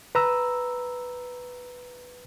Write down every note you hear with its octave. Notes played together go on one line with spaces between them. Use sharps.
B4 A#5 E6